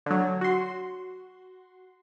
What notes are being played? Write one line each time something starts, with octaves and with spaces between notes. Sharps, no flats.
D3 F#3
F#4 C6